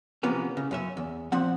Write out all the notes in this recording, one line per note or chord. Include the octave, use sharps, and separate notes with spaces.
C3 E3 F3 A#3 B3 C#4
C#3
F#2 C#4 E5
E2
A#2 F3 C4 F#5